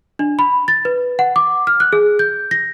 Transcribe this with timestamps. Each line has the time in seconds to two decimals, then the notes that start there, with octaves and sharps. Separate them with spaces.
0.19 D4
0.39 B5
0.68 A6
0.85 B4
1.19 F#5
1.36 D6
1.67 F6
1.80 F#6
1.93 G#4
2.19 G6
2.51 A#6